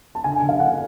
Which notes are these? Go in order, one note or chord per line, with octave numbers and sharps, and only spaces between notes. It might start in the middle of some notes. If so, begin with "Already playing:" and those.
A5
D3 G#5
G#5
D3
F5
D3 F#5